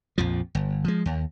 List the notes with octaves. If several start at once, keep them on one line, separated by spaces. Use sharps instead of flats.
A#1 F2 F3
G1
F3 G#3
D#2